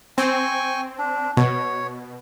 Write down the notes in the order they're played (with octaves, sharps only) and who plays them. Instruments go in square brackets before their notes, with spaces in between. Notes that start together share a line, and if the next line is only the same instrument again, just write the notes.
[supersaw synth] C4 [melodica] G5 G#5 C#6
[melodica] D4
[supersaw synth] B2 [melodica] C#5